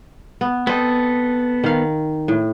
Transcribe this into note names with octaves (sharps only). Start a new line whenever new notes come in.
B3
B3 C4 A4 D#5
D#3 F5
A2